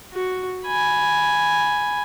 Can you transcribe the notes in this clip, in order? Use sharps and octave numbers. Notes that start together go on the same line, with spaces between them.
F#4
G#5 B5